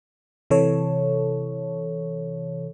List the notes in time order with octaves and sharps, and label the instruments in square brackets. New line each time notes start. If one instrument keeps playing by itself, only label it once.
[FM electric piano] C3 E3 A4 C#5